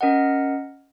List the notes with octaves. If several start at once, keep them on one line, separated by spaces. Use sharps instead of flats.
C#4 A#4 D#5 F#5